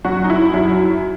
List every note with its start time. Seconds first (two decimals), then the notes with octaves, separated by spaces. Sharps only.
0.05 F#2 F#3 F#4
0.24 D#4
0.30 E4
0.54 F#2 F#3